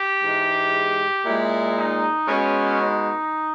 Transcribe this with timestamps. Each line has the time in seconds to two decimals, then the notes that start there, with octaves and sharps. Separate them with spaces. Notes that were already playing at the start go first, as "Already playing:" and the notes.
Already playing: G4
0.22 G#2 E3 G#3
1.25 A#2 G#3 E4
1.76 D#4
2.28 B2 G#3 C#4
2.78 D#4